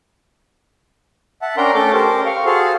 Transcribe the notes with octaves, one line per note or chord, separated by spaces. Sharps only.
E5 F#5 A5
C#4 D4 A#4 G5 A#5 C6
A3 C#4 A4 G5 D6
G4 A#4 C5
F5 C#6
F#4 G#4 A4 C5 F5